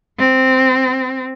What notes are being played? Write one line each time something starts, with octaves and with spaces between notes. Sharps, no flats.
C4